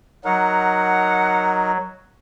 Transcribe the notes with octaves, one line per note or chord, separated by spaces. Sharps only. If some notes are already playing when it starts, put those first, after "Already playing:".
F#3 D#4 A#4 F#5